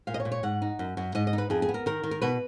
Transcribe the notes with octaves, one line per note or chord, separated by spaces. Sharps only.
A#2 F5
D#5
C#5
A#2
C#5
G#2 F#5
D#4
F#2
F#2
G#2 D#5
D#5
D#4
B4
F2 G#4
G#4
B3
A#4
D#3 A#4
D#3
A#4
B2 B4